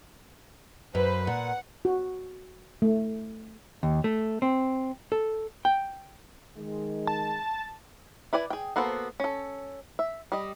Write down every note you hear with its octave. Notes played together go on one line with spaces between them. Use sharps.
F#2 B4 C5
A#2 F#5
F#4
A3
D#2
A3
C4
A4
G5
D#3 G#3
A5
E4 B4 D5 G#5
G#4 G5
A#3 B3 F#4 A4 C5
C#4 A4
E5
G3 D#5